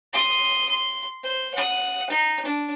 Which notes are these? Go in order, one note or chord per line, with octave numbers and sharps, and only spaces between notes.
C6 D#6
C6
C5
F#5 D#6
D#4
D4